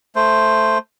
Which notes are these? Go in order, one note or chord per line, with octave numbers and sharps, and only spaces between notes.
A3 C5